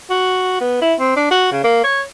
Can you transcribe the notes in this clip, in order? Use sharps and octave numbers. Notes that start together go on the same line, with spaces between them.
F#4
B3
E4
C4
D4
F#4
C#3
A#3
C#5